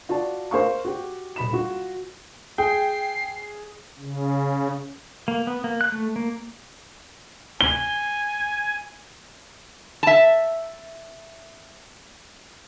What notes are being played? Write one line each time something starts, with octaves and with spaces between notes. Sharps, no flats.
F4 F#4 D5 A5
A#4 C5 F5 C#6
F#4 G4
D#1 B5 E7
F4 F#4
G#4 G5 C7
C#3
A#3
B3
A#3
F#6
A3
A#3
G#5 G7
E5 A5